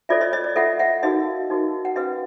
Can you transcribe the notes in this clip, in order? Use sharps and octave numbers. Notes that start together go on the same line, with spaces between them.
F4 A4 C#5 D5 E5
C#5 D#5
C#5 D#5
D5
F4 A4 C#5 E5 F#5
E5 F#5
D#4 F#4 A#4 D#5 F5
D#4 F#4 A#4
F#5
C#4 F#4 B4 D#5 F5